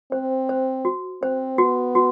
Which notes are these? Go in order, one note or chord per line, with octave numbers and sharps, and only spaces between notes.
C4 C5
C5
F#4
C4 C5
B3 F#4
F#4